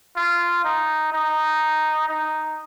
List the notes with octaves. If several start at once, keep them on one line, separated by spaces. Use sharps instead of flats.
F4
D#4
D#4
D#4